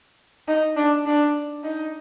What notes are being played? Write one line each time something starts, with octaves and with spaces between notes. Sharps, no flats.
D#4
D4
D4
D#4